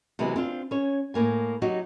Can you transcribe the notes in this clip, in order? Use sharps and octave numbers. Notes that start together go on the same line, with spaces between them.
C3 E3 F#3 G#3 B3
C4 D4 F4
C#4 C#5
A2 A#3 G#5
F#3 D#4 F#4 G4